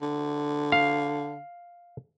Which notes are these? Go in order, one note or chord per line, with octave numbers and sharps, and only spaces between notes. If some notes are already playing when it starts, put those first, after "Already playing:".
D3
F5